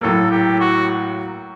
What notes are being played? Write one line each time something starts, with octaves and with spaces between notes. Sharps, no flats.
A2 F#3 A#3 A4
G4
F#4